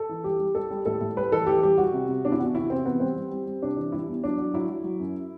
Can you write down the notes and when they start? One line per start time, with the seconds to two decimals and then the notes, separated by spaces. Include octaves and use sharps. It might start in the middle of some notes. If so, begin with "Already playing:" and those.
Already playing: A4
0.09 E3
0.24 G3 G4
0.39 G3
0.55 G3 A4
0.71 G3
0.86 A2 A4
1.01 A2
1.16 G3 B4
1.32 E3 A4
1.47 E3 G4
1.63 G3 G4
1.78 G3 F#4
1.93 C3
2.08 C3
2.24 E2 D4
2.32 E4
2.40 E2 F#4
2.54 C3 E4
2.70 C3 C4
2.85 E3 B3
3.00 G3 C4
3.16 G3
3.31 G3
3.46 G3
3.62 C3 D4
3.77 E3
3.92 G3 E4
4.08 E2
4.24 F#3 D4
4.38 F#3
4.53 F#3 E4
4.69 F#3
4.84 F#3
5.00 F#2